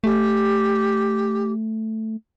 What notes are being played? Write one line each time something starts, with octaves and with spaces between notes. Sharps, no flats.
A3 G4